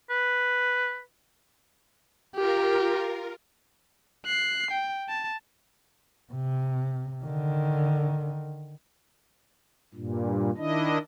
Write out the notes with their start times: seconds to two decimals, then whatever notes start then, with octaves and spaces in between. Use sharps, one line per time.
0.10 B4
2.35 F4 G4 A#4
4.26 F#6 C7
4.71 G5
5.09 A5
6.33 C3
7.24 D3 D#3
9.94 G2 A#2
10.57 D#3 D4 E4 D#5